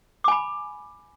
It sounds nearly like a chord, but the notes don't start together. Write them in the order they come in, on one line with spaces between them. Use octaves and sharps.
D6 G#5 B5